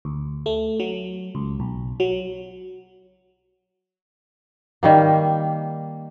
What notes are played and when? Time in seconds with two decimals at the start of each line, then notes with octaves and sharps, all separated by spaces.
0.05 D2
0.46 A3
0.80 F#3
1.35 C#2
1.60 B1
2.00 F#3
4.83 D#3 G3 A#3